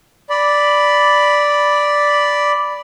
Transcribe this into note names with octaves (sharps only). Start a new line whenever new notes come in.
D5 B5